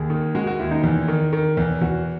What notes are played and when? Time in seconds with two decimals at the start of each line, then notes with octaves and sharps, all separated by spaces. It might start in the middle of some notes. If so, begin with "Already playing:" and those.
Already playing: D#2 G#4
0.10 D#3
0.35 G#3 F#4
0.47 F#4
0.59 D#2 E4
0.71 D#4
0.84 E2
1.08 D#3
1.33 D#3
1.57 E2
1.81 E2 F#4